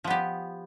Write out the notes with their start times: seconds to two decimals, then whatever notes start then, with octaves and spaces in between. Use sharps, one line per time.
0.04 F3
0.07 B3
0.10 G4